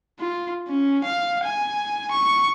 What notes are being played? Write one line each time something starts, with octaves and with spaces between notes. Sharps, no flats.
F4
C#4
F5
G#5
C#6